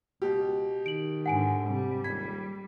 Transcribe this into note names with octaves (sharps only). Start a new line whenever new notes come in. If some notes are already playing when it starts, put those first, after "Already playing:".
C#2 B2 G4
D#3 D7 F#7
G#2 D3 F#5 G#5 D7
C3 G3
D#1 G#6 B6